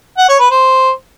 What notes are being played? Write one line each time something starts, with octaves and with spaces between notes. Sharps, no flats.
F#5
C#5
B4
C5